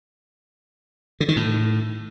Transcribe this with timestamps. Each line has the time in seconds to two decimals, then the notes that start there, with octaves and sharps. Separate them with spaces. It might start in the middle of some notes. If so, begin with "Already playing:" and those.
1.20 D3
1.28 D#3
1.36 A2